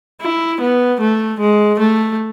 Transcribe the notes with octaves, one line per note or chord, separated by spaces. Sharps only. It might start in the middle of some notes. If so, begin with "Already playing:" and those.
E4
B3
A3
G#3
A3